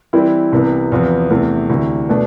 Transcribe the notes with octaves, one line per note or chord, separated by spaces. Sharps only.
E3 G3 C4 E4
C2 C3 E3 B3
E2 C3 F3 B3
E2 C3 E3 A3
D2 C3 E3
B2 A3 D4